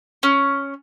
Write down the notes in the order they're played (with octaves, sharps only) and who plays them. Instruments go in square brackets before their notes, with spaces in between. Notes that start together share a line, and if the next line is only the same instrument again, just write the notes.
[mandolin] C#4